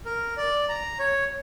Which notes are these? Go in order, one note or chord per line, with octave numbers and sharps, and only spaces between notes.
A#4
D5
A#5
C#5